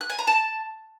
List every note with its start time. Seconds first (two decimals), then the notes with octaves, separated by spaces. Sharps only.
0.01 F#6
0.10 G#5
0.19 A#5
0.27 A5